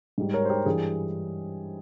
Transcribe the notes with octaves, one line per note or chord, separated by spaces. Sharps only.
G#2 G3
A#4 C#5
C5
G4 A#4
G2 E3 G3 G#4